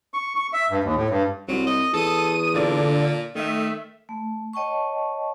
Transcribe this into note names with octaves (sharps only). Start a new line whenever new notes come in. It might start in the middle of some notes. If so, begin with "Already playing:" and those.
C#6
C#6
E5
G2
D#2
A2
G2
C2 F#3
D#5
E2 A4 D#6 D#7
A#2 D3 A4 D5
D#3 A3 E5
A3
C#5 D#5 G5 A5 C#6